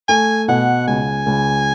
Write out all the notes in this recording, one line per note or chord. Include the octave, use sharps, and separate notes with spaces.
A3 G#5
B2 F#5
C#2 G#5
C#2